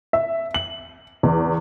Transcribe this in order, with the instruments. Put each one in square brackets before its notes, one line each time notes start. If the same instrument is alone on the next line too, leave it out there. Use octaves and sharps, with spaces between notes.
[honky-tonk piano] E5
F#7
E2